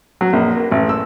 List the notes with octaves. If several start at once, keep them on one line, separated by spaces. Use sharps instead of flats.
F#3
A#1
A#3
A1
E6